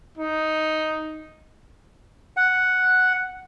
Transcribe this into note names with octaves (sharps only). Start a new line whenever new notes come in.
D#4
F#5